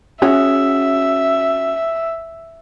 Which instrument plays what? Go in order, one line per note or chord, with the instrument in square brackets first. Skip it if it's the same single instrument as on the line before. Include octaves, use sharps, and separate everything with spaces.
[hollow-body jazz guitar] C#4 F#4 G#4 [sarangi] E5